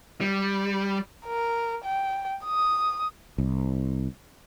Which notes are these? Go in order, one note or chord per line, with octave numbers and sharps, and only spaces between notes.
G3
A#4
G5
D#6
C2